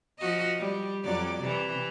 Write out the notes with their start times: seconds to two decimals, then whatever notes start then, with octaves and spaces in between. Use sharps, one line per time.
0.19 F3 F#4 D#5
0.59 G3
1.04 F2 F#3 D5
1.40 C3 E3